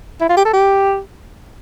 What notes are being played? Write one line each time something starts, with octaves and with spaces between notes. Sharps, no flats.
E4
F4
G4
A4
G4